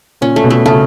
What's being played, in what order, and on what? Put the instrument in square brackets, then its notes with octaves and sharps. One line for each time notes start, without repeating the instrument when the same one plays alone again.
[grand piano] A#2 [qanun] C#4
[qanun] A3
[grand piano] B2
[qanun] A3
[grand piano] C#3 [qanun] A3